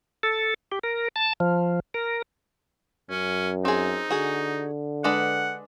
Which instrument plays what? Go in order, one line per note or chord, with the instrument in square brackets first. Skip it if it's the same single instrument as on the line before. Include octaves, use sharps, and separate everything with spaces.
[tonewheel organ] A4
G4
A#4
A5
F3
A#4
[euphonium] F#2 [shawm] C#4
[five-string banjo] C4 G#4 [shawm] D#4
[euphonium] D3 [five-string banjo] F#4 G#4
[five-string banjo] G#3 D4 B4 [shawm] F#5